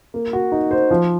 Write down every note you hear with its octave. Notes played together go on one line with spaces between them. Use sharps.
A#3
F#4
D#4
C5
F3